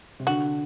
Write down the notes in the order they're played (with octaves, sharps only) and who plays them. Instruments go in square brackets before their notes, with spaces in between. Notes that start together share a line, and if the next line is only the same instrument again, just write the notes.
[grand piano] C3
[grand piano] D3 [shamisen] F#4